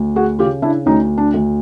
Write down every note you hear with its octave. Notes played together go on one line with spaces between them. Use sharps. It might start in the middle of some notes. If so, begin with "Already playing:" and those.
Already playing: D2
F#4 G#4
C#3 F4 G4
D4 E4
D2 C#4 D#4
D4
D2